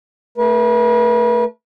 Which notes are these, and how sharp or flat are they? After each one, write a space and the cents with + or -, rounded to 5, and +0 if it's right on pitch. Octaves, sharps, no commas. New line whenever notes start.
A3 +5 B4 -40